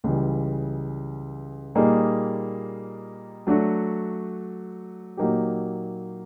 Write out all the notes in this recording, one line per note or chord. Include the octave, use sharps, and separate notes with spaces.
C#2 C#3 E3 G3
A#2 G3 A#3 D#4 G#4
F#3 A3 D4 F#4
A#2 F#3 A#3 D#4 G4